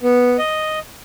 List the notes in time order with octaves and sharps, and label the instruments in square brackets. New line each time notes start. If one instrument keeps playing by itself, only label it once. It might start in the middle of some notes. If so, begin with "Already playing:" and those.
[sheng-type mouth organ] B3
D#5